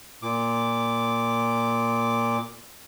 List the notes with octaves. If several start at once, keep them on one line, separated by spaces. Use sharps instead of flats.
A#2 D6